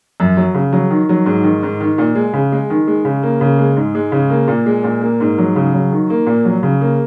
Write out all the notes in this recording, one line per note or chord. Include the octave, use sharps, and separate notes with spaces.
F#2
F#3
C#3
F#3
D#3
F#3
G#2
D#3
G#2
D#3
A#2
G#3
C#3
G#3
D#3
G#3
C#3
A#3
C#3
G#3
G#2
G#3
C#3
A#3
A#2
G#3
A#2
A#3
G#2
F#3
C#3
F#3
D#3
A#3
A#2
F#3
C#3
A#3